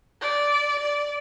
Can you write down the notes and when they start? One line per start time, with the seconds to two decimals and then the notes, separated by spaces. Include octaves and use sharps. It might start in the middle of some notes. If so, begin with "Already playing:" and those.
0.21 D5
0.79 D5